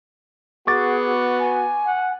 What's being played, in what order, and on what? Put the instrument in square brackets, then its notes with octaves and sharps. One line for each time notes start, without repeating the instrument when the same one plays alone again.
[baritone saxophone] B3 [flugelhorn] F#4 [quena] G#4 [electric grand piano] C#6 D6 A6
[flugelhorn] F#4
[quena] G#5
[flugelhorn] F#5